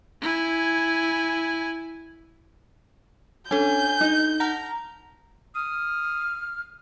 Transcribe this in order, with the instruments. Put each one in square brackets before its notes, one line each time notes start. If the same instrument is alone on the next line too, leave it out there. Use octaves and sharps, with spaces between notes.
[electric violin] E4 G#5
[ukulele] C#4 [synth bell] D4 A4 G7 [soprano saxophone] G#5 [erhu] G6
[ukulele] D#4
[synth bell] F#5 A5 F6 [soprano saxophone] A#5
[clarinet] D#6 [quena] F6